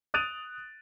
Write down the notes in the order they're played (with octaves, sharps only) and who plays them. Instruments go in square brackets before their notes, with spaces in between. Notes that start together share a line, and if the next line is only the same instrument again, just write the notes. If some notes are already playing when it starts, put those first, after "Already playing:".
[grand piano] D#6 F#6 A6 D7 D#7 F7